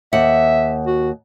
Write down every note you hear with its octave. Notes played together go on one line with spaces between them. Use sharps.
D#2 E5 F#5
F#4